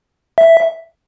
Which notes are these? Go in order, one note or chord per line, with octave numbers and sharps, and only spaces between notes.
E5